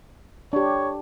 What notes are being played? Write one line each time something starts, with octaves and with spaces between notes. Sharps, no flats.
D4 G4 C#5